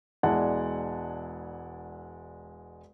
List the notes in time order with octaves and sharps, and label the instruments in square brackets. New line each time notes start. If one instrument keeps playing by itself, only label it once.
[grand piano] E1 G#3 E4 D5 F#5 A5